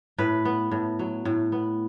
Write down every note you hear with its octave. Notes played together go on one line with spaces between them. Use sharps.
A2 B4
B3
A2
F#3
A2
B3